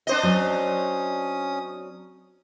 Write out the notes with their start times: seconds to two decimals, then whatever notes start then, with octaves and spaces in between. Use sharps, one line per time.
0.07 D4 C5 D#5
0.23 F#3 C4 C#4 D#6